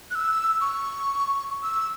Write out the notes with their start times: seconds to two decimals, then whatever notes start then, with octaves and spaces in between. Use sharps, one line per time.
0.11 F#6
0.15 E6
0.61 C#6
1.63 E6